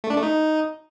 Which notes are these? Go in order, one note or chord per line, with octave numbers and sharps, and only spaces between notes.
A3
D4
A3
D#4